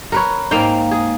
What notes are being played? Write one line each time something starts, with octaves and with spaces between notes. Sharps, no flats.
A#4 B4 C#5
G#2 A#3 F5 G5
G#4